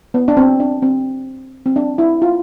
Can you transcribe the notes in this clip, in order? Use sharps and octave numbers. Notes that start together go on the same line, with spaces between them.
B3
D4
C4
D4
C4
C4
D4
E4
F4